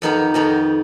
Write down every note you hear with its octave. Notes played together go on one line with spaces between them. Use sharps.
F2 D#3 B3 D#4 G4
F2 D#3 B3 D#4 G4